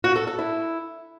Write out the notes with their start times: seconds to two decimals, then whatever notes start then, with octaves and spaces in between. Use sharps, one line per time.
0.04 F#4
0.16 A4
0.27 A4
0.39 E4